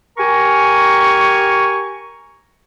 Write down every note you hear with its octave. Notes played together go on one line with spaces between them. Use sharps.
G4 A#4 G#5 A#5 C#6